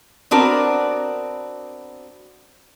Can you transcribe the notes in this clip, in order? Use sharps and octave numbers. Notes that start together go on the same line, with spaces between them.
B3 C4 D4 F#4 A#4